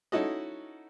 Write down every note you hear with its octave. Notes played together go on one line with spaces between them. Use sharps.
C#4 D#4 E4 F#4 A4 D#5